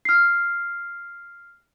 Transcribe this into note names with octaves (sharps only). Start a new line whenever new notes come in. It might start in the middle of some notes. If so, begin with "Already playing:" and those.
F6 C7